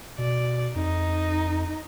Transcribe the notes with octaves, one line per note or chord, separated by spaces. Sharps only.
B2 D5
F2 D#4